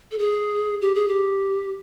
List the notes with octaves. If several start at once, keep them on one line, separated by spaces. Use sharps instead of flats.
A4
G#4
G4
G#4
G4